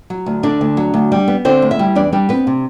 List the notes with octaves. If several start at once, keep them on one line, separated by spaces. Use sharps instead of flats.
F#3
D2
D3 D4 D5
D2
F#3
D2
G3
B3
D3 C4 C5
D2
E4 E5
G3
E2 D4 D5
G3 D4 D5
B3 C4 B4
C3